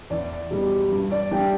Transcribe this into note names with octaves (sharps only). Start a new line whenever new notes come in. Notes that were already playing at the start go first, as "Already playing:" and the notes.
E2 D5
B2 G3
G2
D5
E3 G3 D4 G5